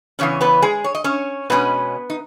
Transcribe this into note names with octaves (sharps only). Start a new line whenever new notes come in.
E2 C#3 E3 C#4 C#5
B3 B4
G#3 G#4
C#5
D#5
C#4 C#5
B2 G#3 B3 C#4 B4
D#4